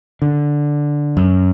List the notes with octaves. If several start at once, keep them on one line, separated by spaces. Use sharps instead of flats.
D3
F#2